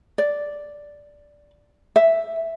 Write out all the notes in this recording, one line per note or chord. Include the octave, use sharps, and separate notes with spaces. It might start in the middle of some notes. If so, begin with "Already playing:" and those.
D5
E5